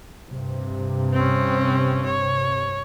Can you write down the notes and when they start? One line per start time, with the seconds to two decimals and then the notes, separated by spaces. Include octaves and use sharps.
0.30 G2 C3
1.14 C4 C#4
2.05 C#5